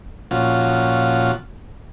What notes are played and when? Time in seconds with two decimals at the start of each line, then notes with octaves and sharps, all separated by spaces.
0.31 A#2 F3 C#4 F4 F#4